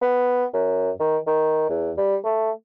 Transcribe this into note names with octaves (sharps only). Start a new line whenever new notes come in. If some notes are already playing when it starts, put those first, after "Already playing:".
B3
F#2
D#3
D#3
E2
G3
A3